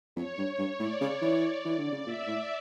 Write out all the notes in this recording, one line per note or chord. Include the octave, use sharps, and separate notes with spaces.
F2 C#5
G2
G2
A2 D5
C#3
E3
D5
E3
D3
C#3
A#2 E5
A2